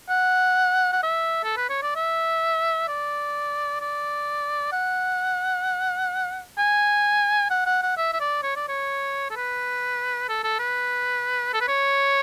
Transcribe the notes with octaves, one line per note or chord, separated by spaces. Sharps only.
F#5
F#5
E5
A4
B4
C#5
D5
E5
D5
D5
F#5
G#5
F#5
F#5
F#5
E5
E5
D5
C#5
D5
C#5
A4
B4
A4
A4
B4
A4
B4
C#5